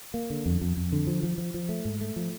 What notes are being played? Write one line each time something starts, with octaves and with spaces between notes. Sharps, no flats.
A#3
D3
F2
F2
F2
D3
F3
F3
F3
F3
A3
G#2
A3
F3